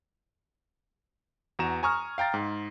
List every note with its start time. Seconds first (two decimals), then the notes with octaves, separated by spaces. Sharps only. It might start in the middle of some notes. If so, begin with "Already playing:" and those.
1.59 E2 F#4 A#5 E7
1.83 G#5 A#5 C#6 D#6 F6
2.18 F5 G5 A#5 A6
2.34 G#2